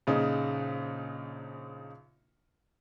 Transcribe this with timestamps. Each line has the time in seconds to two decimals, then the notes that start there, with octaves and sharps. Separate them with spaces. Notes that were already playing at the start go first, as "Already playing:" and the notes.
0.07 A#1 C#3 D#4